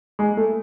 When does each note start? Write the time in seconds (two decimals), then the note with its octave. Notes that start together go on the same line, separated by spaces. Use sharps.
0.19 G#3
0.37 A3